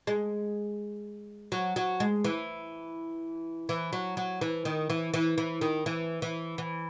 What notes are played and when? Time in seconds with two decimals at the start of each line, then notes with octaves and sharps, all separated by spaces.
0.07 G#3
1.52 F#3
1.76 F#3
2.00 G#3
2.24 E3
3.69 E3
3.93 F#3
4.17 F#3
4.41 E3
4.65 D#3
4.90 E3
5.14 E3
5.38 E3
5.61 D#3
5.86 E3
6.22 E3
6.58 E3